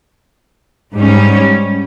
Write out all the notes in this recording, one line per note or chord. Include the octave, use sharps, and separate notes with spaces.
G#2 G3 C#4